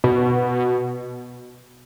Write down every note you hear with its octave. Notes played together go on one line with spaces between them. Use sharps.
B2